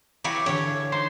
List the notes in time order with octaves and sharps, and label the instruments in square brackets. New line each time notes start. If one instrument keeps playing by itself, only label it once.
[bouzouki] E3 F#3 G4 [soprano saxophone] C#6
[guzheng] D3 E3 [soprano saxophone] G4 [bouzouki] C#5
[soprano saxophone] F5
[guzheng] D#4 [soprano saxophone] C6